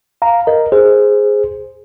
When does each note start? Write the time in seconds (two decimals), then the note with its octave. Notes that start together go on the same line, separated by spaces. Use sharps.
0.22 F5 A#5
0.47 A#4 D#5
0.72 G#4 C5